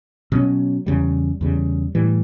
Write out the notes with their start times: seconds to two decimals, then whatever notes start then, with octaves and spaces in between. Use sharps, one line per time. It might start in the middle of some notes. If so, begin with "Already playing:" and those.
0.32 B2 F#3 C#4
0.86 E2 C#3 G3
1.41 E2 C#3 G3
1.95 A2 E3 G3